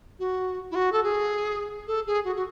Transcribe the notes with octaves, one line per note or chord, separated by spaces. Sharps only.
F#4
E4
F#4
A4
G#4
A4
G#4
F#4
F#4